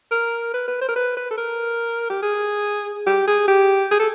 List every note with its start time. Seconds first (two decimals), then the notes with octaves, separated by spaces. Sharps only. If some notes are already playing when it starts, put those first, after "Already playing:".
0.11 A#4
0.54 B4
0.68 B4
0.81 C5
0.89 A#4
0.96 B4
1.17 B4
1.31 A4
1.38 A#4
2.10 G4
2.23 G#4
3.07 G4
3.27 G#4
3.48 G4
3.91 G#4
4.00 A4